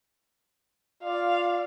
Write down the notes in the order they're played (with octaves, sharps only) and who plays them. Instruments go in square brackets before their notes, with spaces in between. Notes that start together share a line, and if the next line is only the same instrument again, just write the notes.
[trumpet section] F4 D5 [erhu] F5